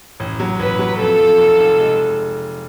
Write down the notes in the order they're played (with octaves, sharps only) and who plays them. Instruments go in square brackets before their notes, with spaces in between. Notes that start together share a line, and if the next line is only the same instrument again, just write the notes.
[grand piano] A1
F#3
[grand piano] A1 [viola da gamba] B4
[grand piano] F#3
[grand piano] F2 [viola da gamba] A4
[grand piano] F2
F1
F1
G#3